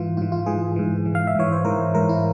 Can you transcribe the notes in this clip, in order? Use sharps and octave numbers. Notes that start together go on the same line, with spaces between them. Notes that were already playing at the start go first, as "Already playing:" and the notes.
Already playing: G#2 E3 F4
G#2 E3 F4
F4
G#2 E3 G#4
G#2 E3
G#2 E3
F5
E5
G#2 E3 C#5
C5
G#2 E3 A#4
G#2 E3 A#4
E4